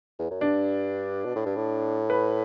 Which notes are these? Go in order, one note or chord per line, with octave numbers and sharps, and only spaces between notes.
E2
F#2
G2 D4
B2
A2
G2
A2
B4